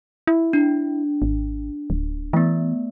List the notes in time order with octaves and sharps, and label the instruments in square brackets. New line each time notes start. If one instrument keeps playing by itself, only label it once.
[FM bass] E4
[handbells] D4
[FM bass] G#1
D1
[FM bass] E3 [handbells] A3 B3